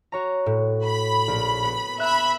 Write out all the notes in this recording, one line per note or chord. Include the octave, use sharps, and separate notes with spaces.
F#4 C#5 A#5
A2
B5
A#1
B3
E5 B5 F#6